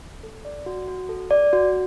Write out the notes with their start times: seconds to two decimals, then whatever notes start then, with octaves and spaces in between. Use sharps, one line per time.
0.23 A4
0.45 D5
0.66 F#4
0.88 F#4
1.09 A4
1.31 D5
1.53 F#4